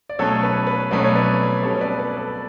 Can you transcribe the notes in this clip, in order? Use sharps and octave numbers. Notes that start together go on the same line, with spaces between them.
D5
B2 F#3 A3 C#4 A4 C#5
B4
B4
B2 F#3 A3 C#4 B4 D5
C#5
B4 D5
B2 G3 C#4 A4 C#5
B4 D5
B4
A4